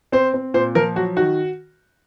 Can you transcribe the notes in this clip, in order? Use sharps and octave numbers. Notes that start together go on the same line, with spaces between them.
C4 C5
C4
A#2 C5
F3 A#4
F#3 F#4
D#3 F#4